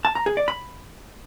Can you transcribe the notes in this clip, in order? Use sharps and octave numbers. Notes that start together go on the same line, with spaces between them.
A5
A#5
G#4
D5
B5